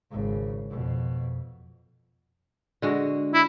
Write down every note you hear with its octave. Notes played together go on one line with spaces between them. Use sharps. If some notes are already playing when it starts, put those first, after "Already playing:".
G#1 C#3
F2 B2
D3 G#3 F#4
E4